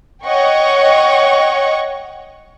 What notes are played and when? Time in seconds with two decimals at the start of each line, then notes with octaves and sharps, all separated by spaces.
0.24 C#5 D#5 F#5 G5 C#6